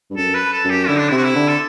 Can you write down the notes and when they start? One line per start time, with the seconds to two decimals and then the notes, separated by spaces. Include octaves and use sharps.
0.10 G2
0.17 F#2 A4
0.35 B4
0.52 A4
0.64 F#2
0.70 G4
0.88 D3 E4
0.98 D4
1.09 C3 E4
1.16 F#4
1.24 E4
1.35 D3
1.48 A4